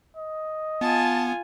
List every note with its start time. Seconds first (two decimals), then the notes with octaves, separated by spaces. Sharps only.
0.16 D#5
0.81 B3 F4 G#5 A5